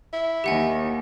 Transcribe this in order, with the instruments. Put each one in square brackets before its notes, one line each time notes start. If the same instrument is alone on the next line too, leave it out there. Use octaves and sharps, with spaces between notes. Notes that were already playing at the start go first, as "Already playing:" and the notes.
[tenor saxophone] E4
[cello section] D#2 [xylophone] G4 F#5 G#5